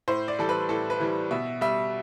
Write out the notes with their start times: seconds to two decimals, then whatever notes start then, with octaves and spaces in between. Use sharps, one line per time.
0.08 A2 C5
0.28 D5
0.39 E3 G3 A4
0.49 B4
0.69 A2 A4
0.90 B4
1.00 E3 G3
1.31 B2 E5
1.61 G3 E5